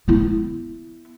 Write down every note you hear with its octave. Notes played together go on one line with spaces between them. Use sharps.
B3 E4